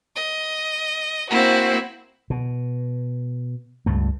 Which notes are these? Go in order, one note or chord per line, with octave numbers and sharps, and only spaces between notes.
D#5
A#3 C4 E4 F#4
B2
C#2 G2 A3